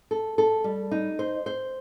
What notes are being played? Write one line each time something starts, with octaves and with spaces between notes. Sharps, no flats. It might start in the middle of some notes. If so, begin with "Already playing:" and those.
A4
A4
G3
D#4
C5
C5